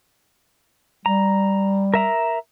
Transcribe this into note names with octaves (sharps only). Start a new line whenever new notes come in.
G3 A#5
A#4 E5 A#5